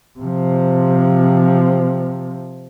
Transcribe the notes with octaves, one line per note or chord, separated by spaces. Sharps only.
C3 F3